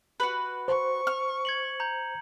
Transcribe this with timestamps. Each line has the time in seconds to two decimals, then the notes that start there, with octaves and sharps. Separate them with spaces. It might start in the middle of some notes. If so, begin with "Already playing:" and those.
0.20 F#4 B4
0.68 C5 C#6
1.07 F6
1.45 G#6 C#7 F#7
1.80 A#5 G6